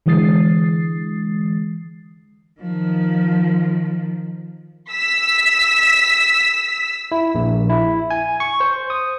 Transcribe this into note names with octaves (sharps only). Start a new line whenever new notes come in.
D3 E3 G#3 D#6 A6 C7
D#3 F3
E6 B6
E4
A#1
E4
G#5
C#6
C5
D#6